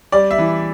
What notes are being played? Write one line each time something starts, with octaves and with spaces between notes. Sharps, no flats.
G3 D5
E5
E3